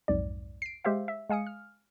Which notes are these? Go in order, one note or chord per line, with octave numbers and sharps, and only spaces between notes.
B1 F2 G#2 D5
C7 D7
G#3 G4 C5 E5 F5
E5
G#3 F5 G#5 D#6 C#7
F6